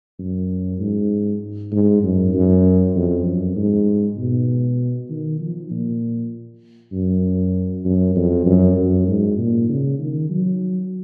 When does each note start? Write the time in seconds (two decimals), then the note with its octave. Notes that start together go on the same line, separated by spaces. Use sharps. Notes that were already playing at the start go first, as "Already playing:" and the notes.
0.19 F#2
0.80 G#2
1.72 G#2
2.03 F#2
2.34 F#2
2.95 F2
3.26 F#2
3.56 G#2
4.18 B2
5.09 D#3
5.40 F3
5.71 A#2
6.93 F#2
7.85 F#2
8.16 F2
8.46 F#2
8.77 F#2
9.08 G#2
9.38 A#2
9.69 C#3
9.99 D#3
10.30 F#3